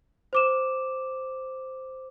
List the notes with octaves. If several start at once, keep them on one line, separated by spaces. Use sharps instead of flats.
C5 D6 E7